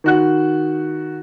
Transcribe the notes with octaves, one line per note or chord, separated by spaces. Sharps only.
D#3 F#4 F#6